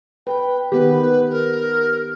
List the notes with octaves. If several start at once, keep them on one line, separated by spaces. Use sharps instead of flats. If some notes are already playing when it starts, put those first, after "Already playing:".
B4 G5
D#3 B3 G4 B4
A#4